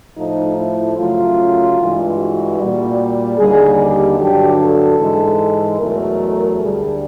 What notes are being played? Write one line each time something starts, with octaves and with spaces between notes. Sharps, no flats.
A2 F3 A3 D#4
E4
F#2 C#3 F#3 A3 F4
G2 E3 G#3
F#4
A#2 G3
D#2 D3 G3 G#4
G4
G2 D3 F#3 G4
A4
G#2 E3 G#3
E2 B2 F#3 A3 A#4
D2 D3 G3 G#4